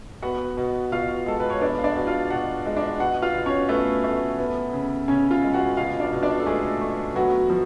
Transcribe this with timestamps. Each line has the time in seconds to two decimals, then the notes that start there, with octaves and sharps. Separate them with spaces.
0.22 B3 F#4 F#5
0.57 B2
0.91 B2 F4 F5
1.26 G#3 A4
1.40 B4
1.50 C#5
1.61 B3 D4 D5
1.78 F5
1.84 D4 D5
1.95 B2
2.07 F4 F5
2.30 B2 F#4 F#5
2.66 G#3
2.77 D4 D5
3.00 B2 F#4 F#5
3.22 F4 F5
3.34 B2
3.46 C#4 C#5
3.69 A3 B3 B4
4.04 A3
4.38 B3
4.73 C#3
5.08 C#3 C#4 C#5
5.31 F4 F5
5.43 G#3
5.54 F#4 F#5
5.77 B2 F4 F5
6.00 D4 D5
6.12 B2
6.23 D4 D5
6.40 A4
6.46 G#3 A3 G#4
6.81 A3
7.15 F#3 B3 F#4
7.50 F3